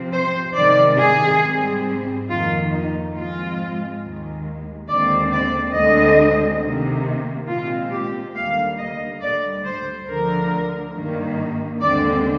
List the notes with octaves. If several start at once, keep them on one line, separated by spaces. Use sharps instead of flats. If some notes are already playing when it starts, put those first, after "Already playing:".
Already playing: C3 F3 C4
C5
C3 D#3 G#3 D5
G#4
G#2 G3 C4
F2 D#3 A#3 F4
D#4
G#2 F3 G#3 C4 F4
D#2 D#3 G#3
D#2 D3 G#3 C4 D5
D5
D2 D3 G#3 C4 D#5
C3 D#3 A#3
A#2 G#3 C4 F4
G4
D#2 D3 G3 A#3 F5
D#5
D2 D3 G3 D5
C5
D2 D3 F3 A#4
G2 D#3 A#3
D#2 D3 G#3 C4 D5